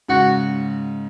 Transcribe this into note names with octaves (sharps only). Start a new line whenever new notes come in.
G#2 C#3 F#4